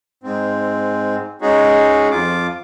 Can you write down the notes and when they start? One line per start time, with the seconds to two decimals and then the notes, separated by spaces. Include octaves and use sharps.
0.23 G#2 C4
1.42 G#3 C#4 D#4 F#4 G#4
2.11 F2 F4 D6